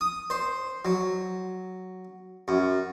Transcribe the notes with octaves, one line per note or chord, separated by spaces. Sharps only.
D#6
C5
F#3
F#2